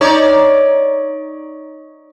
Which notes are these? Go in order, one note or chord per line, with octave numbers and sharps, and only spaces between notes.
D#4 C#5 D5